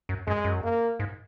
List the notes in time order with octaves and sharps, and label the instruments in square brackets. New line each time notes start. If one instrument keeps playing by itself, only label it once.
[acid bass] F#2
[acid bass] F#2 [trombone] G#3
[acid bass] F#2
[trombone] A#3
[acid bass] G#2